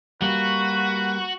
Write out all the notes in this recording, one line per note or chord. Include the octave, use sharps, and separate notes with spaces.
G3 A#3 F#4 B4